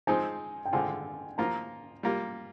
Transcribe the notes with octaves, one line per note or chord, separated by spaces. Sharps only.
F3 G#3 C4 D#4 G#5
G5
D3 G#3 C4 F4 G#5
F3 A#3 F4 A#5
G3 A#3 F4